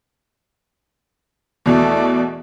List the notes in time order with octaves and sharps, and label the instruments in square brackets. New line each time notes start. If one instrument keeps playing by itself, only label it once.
[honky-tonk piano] E2 B2 [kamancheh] A3 D5